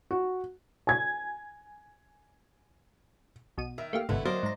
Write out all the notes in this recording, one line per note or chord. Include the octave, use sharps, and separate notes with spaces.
F#4
G#5 G#6
B1 B2 D#7
D#3 E5
A3 A#3 G4 F5
G1 C2 G#2 D3 A3 B3 E4
F#3 A#3 C5 D5 D#5
G#2 A#5